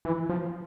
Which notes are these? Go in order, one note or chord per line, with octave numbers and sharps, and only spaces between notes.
E3
F3